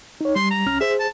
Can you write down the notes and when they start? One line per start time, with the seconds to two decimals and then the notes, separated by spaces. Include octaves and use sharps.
0.21 D#4 C#5
0.36 G3 C6
0.51 A#5
0.66 C2 C#4 F6
0.81 G#4 C5 E5
1.00 A5